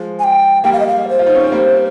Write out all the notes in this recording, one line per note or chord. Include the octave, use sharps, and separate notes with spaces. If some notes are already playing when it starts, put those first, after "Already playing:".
Already playing: F3 G#3
G#5
G5
G3 A#3 G5
F5
D#5
F5
C5
F4
D#4
C#4
C4
G3 A#3